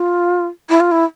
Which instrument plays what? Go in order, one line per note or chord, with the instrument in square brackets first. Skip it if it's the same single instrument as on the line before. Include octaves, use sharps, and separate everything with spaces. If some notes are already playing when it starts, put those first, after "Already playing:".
Already playing: [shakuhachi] F4
E4
F4
E4